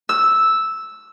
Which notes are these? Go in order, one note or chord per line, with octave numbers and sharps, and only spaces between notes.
E6